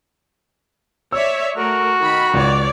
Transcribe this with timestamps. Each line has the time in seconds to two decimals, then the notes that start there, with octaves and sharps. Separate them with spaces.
1.12 C#5 D5 E5 E6
1.57 A3 F#4 A#4
1.99 D#3 B5
2.34 C#2 C#5 D5